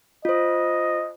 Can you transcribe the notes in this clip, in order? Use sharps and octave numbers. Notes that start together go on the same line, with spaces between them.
F4 C5 D#5